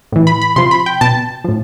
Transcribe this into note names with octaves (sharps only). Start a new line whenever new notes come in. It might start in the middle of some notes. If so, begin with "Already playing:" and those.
A2 E3
B5
B5
C3 F3 C6
B5
G5
B2 A5
A2 F3